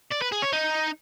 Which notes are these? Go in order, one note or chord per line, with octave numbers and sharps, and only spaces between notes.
D5
B4
G#4
C#5
D#4